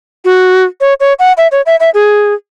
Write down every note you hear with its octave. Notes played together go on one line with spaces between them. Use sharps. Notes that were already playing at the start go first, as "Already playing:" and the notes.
F#4
C#5
C#5
F#5
E5
C#5
E5
E5
G#4